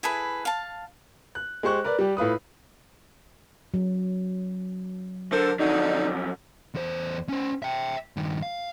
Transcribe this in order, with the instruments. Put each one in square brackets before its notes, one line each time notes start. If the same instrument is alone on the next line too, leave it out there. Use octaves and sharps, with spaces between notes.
[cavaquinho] E4 G#4 A4 B4
F5 A5
[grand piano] F#6
G#3 G4 C5 C#6 F#6
A#4 B4 D5
G3 G4
A2 F4 B4 D#6
[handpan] F#3
[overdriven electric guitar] D3 [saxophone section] A4 A#4 C5
[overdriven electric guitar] F2 F#3 [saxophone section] D3 D#4
[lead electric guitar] E2 C5
C#4 C5
E5 G5
G2 D#3
F5